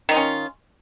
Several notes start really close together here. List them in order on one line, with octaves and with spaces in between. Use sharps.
D#3 D#4 F4 C#4